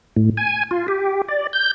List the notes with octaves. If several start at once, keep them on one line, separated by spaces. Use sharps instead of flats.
A2
G#5
F4
G4
D5
G6